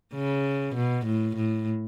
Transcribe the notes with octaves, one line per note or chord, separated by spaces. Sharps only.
C#3
B2
A2
A2